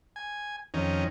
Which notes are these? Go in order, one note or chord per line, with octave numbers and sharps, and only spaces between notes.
G#5
F2 D#3 C#4 D#4